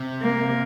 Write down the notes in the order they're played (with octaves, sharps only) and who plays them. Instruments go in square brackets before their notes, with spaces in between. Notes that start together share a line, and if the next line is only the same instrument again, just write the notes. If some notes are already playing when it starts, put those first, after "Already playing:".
Already playing: [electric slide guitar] C3
[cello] A#3